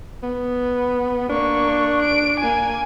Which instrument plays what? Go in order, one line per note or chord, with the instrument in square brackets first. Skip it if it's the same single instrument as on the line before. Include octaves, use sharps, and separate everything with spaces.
[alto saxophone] B3
[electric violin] A#3 C#6 [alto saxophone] D4
[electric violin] D7
A#3 G#5